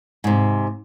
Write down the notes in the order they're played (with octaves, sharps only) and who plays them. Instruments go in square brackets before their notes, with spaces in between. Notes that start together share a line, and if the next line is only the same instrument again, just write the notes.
[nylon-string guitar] G#2 C3